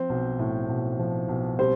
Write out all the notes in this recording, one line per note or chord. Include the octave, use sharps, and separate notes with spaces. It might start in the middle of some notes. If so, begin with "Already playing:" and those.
Already playing: F3 C4 C5
B1
A2
B1
F3
B1
G3 C4 C5